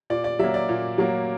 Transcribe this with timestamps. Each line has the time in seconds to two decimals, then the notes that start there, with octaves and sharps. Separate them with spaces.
0.10 A#2 D5
0.24 D5
0.39 F#3 A#3 E5
0.54 D5
0.69 A#2
0.98 F#3 A#3